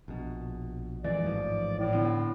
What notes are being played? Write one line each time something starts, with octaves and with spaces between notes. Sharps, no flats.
A#1 B2
F2 E3 G#3 D5
A1 G#2 F3
A2
D3 B3 C4